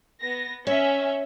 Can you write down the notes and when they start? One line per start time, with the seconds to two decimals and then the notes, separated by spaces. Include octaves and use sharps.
0.22 B3 A#6
0.67 C#4 C#5 E5